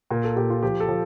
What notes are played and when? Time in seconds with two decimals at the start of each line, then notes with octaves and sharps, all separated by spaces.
0.11 A#2 A#4
0.24 A4
0.36 A#2 G4
0.50 F4
0.63 F3 G4
0.80 A4
0.89 F3